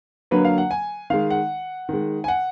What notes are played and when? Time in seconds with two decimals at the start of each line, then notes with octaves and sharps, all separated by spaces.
0.31 D3 F#3 A#3 B4
0.45 F5
0.58 F#5
0.71 G#5
1.10 D#3 G#3 F5
1.30 F#5
1.89 D#3 G#3
2.24 G#5
2.28 F#5